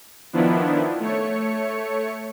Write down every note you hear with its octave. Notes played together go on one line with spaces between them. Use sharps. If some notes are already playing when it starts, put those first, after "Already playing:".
D#3 F3 B3 D4 E4
A3 C#5 C#7